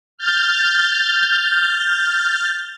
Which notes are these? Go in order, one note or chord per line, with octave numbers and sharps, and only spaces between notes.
F6 G6 A6